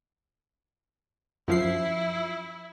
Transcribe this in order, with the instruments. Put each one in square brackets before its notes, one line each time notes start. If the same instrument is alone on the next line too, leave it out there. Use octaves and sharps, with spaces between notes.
[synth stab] F#2 F3 C7 [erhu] E4